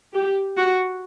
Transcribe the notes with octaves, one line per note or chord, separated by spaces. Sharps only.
G4
F#4